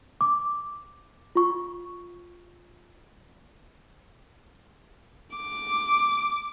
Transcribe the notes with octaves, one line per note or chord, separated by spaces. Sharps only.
D6
F4 C#6
D6